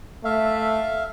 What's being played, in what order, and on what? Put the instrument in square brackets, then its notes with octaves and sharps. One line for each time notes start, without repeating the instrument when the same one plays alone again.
[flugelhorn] A3 [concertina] E5 F5